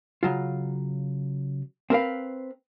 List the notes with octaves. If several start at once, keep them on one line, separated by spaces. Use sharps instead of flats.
C#3 F#3 F4
C4 A#4 B4 F5